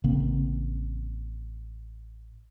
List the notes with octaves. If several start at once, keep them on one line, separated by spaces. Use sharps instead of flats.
A1 C#3 A#3 C4